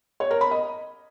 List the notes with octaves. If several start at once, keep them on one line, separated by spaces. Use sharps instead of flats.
C#5
A#4
B5
D#5